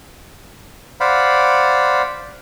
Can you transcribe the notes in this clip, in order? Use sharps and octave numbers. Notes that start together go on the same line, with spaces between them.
C5 D5 F5 F#5 B5